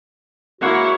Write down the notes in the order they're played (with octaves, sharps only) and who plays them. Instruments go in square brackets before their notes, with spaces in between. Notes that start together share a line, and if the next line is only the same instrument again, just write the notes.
[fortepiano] G#3 A#3 F#5 [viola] E4 C#5 [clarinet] F#4